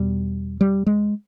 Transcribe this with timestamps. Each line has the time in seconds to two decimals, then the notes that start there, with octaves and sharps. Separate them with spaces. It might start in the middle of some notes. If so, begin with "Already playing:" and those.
Already playing: E2 B2 G3
0.61 G3
0.86 G#3